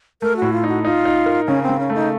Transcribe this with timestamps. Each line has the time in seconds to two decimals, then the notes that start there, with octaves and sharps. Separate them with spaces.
0.22 A3 A#4
0.37 F#4
0.42 A2
0.53 F4
0.64 D#4 F#4
0.84 D#4 F4
1.05 D#4
1.26 A#4
1.47 C#3 C#4
1.63 C4
1.69 C#3
1.79 C#4
1.90 A3 D#4